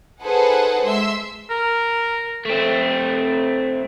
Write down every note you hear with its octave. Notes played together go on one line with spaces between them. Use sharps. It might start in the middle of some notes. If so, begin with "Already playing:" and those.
D#4 G#4 A4 B4 C5 F#5
G#3 E5 C6 E6
A#4
A3 C4